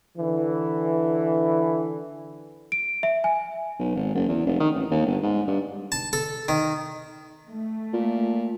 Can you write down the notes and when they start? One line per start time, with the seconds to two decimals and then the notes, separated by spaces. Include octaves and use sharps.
0.16 D3 E3
2.72 D7
3.03 E5
3.24 G#5
3.80 B1
3.95 G#1
4.14 F#1
4.29 E2
4.46 F1
4.60 D#3
4.75 A1
4.91 D#2
5.06 G1
5.22 G#2
5.48 G2
5.92 A5
6.13 A4
6.48 D#3
7.49 A3
7.93 A#2